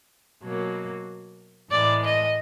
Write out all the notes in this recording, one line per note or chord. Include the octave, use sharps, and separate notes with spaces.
B2 F#3 A#3
A2 E3 G#3 D5
D#5